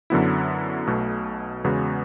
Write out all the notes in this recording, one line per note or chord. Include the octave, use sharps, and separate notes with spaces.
F#2 D3 F#3 B3 E4
B1 B2 A3
E2 C#3 G#3 B3 F#4